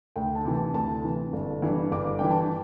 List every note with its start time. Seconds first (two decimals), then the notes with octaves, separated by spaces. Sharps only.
0.16 D2 G5
0.35 A5
0.45 C3 E3
0.55 A5
0.74 D2 A5
1.04 C3 E3
1.33 G1
1.62 G2 E3
1.92 G1 D6
2.19 G2 E3 G5
2.31 A5